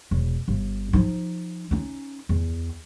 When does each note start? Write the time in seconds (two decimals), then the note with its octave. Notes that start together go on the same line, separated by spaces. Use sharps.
0.11 E1
0.48 G1
0.93 F3 D#4
1.71 C#4 D#4
2.29 E2